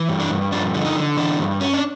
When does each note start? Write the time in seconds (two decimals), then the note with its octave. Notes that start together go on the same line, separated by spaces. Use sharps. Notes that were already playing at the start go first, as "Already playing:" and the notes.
Already playing: E3
0.09 G2
0.20 D4
0.30 G2
0.52 F3 D4
0.74 D3
0.85 D#4
0.96 D3
1.17 E3 D4
1.39 G2
1.61 C#4
1.74 D4